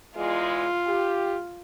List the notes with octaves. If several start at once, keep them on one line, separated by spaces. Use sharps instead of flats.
E2 G#3 F4
G4